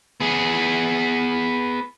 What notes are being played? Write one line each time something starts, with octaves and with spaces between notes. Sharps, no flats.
B3 G#4